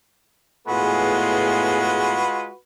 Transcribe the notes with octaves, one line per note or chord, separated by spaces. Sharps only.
A2 G#3 B3 F4 F#4 G#4 B4